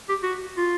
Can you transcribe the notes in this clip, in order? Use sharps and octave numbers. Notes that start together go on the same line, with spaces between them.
G4
F#4
F4